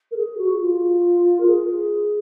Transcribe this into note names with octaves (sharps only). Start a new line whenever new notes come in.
A#4
G#4
F#4
F#4
F4
A#4
G#4